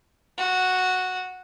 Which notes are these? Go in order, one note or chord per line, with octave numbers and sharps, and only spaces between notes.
F#4